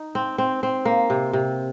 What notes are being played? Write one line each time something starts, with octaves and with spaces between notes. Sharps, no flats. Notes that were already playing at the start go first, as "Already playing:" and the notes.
Already playing: D#4
C4
C4
C4
A#3
C3
C3